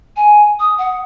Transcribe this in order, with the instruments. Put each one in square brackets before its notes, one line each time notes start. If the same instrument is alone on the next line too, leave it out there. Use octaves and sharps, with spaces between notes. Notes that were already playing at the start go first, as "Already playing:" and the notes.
[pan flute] G#5
D#6
F#5